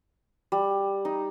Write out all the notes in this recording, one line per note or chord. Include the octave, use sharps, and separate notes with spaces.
G3
D#4